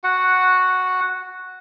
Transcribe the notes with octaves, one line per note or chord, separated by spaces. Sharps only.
F#4 F#5